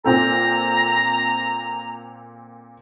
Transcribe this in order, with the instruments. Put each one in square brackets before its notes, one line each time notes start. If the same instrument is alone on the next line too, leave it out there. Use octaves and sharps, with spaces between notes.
[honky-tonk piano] A#2 C4 A4 [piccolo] A#5